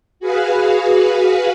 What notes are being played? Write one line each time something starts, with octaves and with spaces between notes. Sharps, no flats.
F#4 G#4 B4 F5